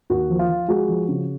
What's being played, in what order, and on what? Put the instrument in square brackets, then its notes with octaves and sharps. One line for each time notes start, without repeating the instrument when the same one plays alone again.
[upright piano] D#2 F#4
F3
F4
F3
G#3 F#4
F3
C#3